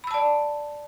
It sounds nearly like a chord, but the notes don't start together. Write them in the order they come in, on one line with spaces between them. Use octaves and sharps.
B5 E6 A5 D5